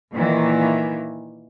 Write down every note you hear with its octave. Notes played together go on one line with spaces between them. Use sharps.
A#2 D#3 E3